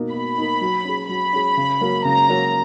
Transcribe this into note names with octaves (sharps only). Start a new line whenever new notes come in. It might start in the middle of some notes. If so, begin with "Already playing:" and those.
Already playing: B2 A#3 D#4
B2 B5
A#3 D#4
F#3
C#4 G#4
F#3 B5
C#4 G#4
C#3
F#3 A#3 C#4
C#3 A#5
F#3 A#3 C#4